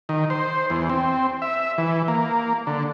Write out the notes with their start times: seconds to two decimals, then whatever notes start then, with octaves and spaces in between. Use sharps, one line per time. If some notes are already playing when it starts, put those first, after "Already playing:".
0.09 D#3
0.30 C5
0.70 E2
0.90 C4
1.42 E5
1.78 E3
2.08 A#3
2.67 D3